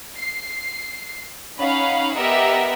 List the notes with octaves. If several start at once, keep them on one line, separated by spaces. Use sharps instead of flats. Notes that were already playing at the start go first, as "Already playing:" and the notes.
C7
C#4 D#4 F5 F#5 B5
B3 G4 A#4 D#5 E5 F#5